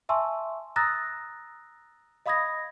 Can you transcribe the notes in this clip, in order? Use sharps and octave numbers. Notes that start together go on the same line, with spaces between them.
E5 G#5 A5 C6 C#6 E6
A#5 D#6 E6 F#6 A6 A#6
D#5 F5 B5 D#6 G#6 A#6